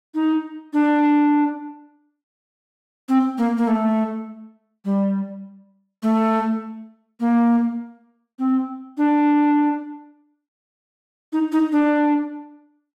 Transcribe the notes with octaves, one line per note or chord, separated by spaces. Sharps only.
D#4
D4
C4
A#3
A#3
A3
G3
A3
A#3
C4
D4
D#4
D#4
D4